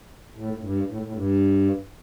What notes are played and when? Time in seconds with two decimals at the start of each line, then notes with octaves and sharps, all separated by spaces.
0.35 A2
0.53 A2
0.61 G2
0.87 A2
1.02 A2
1.13 G2